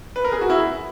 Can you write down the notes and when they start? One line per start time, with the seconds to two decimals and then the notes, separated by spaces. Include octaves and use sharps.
0.16 B4
0.24 A#4
0.32 G#4
0.41 F#4
0.50 E4